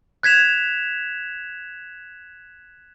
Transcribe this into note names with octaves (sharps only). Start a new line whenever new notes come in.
F#6 G#6 B6 E7 F7